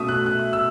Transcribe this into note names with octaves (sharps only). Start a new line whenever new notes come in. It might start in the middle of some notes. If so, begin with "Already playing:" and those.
Already playing: B2 A3 C#4 E5 D#6
F#6
F#6
E6